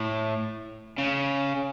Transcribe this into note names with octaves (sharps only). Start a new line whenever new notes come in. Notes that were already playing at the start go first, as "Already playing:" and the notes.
Already playing: A2
C#3